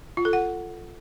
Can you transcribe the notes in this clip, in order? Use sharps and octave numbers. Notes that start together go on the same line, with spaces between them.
F4
A4
F#5